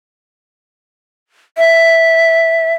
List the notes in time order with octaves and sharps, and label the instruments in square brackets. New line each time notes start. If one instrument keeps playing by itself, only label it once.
[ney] E5